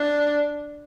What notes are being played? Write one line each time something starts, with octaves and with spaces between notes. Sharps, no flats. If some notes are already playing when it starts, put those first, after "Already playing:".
Already playing: D4